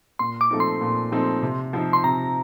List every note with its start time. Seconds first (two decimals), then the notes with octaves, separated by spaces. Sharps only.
0.19 A#2 C6
0.41 D6
0.51 F3 A3 C4 D#4
0.60 C6
0.81 A#2
1.12 F3 A3 C4 D#4
1.43 C3
1.73 F3 C4 D#4
1.93 C6
2.04 C3 A#5